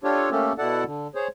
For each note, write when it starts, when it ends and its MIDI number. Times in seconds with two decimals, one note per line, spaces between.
0.04 0.30 62
0.04 0.30 65
0.04 0.30 67
0.04 0.30 69
0.04 0.30 73
0.31 0.53 57
0.31 0.53 58
0.31 0.53 61
0.31 0.53 67
0.31 0.53 69
0.58 0.84 47
0.58 0.84 64
0.58 0.84 69
0.58 0.84 74
0.58 0.84 78
0.58 0.84 81
0.85 1.07 50
1.15 1.28 68
1.15 1.28 72
1.15 1.28 73